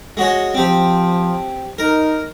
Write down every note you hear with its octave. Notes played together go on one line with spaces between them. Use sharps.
G#3 F#4 C#5
F3 C4 G4
D#4 A#4